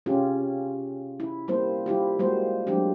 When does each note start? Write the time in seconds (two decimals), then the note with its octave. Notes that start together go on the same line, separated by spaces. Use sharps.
0.06 C3 C#4 F4 G4 G#4
1.20 E4
1.48 G3 A#3 C4 E4 C5
1.86 G3 E4 F4 G4
2.19 G3 G#3 A#3 F#4 C5
2.67 F#3 G#3 A3 C4 D4 G4